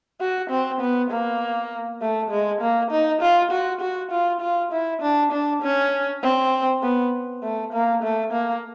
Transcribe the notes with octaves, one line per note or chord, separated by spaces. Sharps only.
F#4
C4
B3
A#3
A3
G#3
A#3
D#4
F4
F#4
F#4
F4
F4
E4
D4
D4
C#4
C4
B3
A3
A#3
A3
A#3